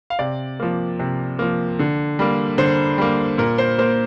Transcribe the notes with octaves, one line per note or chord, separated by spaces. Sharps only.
F5
C3 D5
F3 A#3
C3
F3 A#3
D3
G3 A#3
D3 C5
G3 A#3
A#2 A#4
C5
A#3 C5